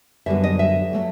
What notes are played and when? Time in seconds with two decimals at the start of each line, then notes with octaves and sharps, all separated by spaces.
0.26 F#2 D3 G3 B3 E5
0.44 D#5
0.59 E5
0.93 F#3 A3 C#4